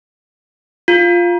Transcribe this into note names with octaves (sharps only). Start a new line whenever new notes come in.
F4